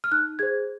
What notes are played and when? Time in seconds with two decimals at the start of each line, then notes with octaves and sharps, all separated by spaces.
0.04 F6
0.12 D#4 F#6
0.39 G#4 C5 G#6